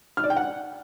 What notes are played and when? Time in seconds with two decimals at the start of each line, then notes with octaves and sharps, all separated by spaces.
0.17 F6
0.24 D5
0.30 G5
0.37 F#5